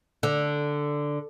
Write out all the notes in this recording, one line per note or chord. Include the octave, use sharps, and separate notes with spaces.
D3